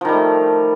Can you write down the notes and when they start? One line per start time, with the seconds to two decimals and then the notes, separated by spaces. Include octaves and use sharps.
0.01 F3
0.05 D#3
0.09 G3
0.12 A3